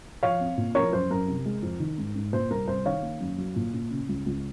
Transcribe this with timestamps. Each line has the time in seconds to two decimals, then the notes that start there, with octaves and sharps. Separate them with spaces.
0.23 F3 C#5 F5
0.40 C4
0.57 A#2
0.75 F3 A#4 C#5
0.93 F#2 C5
1.11 F#2 A#4
1.28 C3
1.46 G#3
1.63 F2
1.80 D#3
1.98 G#2
2.16 G#2
2.33 A#2 C5
2.50 C2 A#4
2.68 C2 C5
2.86 D#3 C#5 F5
3.03 A#3
3.21 F#2
3.38 F#3
3.56 A#2
3.74 A#2
3.90 C#3
4.09 C#2
4.26 C#2